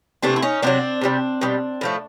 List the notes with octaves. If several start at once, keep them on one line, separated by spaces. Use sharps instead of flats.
C3 E3 A3 C4 D4
E4
C#4 D#4
C3 D#3 F#3 C4 D4
C3 D#3 G3
B2 G3
A2 F3 A3